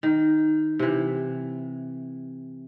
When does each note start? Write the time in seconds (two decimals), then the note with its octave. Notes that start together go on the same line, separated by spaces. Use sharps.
0.03 D#3
0.79 C3 E3